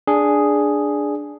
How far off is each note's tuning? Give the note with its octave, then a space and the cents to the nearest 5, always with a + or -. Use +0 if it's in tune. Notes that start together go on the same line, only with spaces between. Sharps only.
D4 +0 G#4 +0